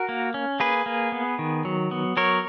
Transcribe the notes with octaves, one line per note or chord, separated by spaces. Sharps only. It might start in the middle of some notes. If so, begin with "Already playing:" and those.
Already playing: F#4 A#4
A#3
C#4
A#3 G#4 B4
A#3
B3
D#3
F#3
B3
F#3 A#4 C#5